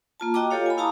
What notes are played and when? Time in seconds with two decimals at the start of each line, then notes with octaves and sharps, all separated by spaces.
0.20 A#3 F4 A5
0.34 F#4 D#5 G5 A#5 D6
0.51 F4 G4 A4 C#5 F5
0.66 G#5 B5
0.77 E4 F5 A5 A#5 D6 D#6